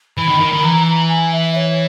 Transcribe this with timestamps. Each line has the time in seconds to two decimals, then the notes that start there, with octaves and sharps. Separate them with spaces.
0.18 E3 B5
0.28 D#3
0.40 D#3
0.52 D#3
0.63 E3 A#5
0.86 A#5
1.08 G#5
1.32 E5
1.55 C#5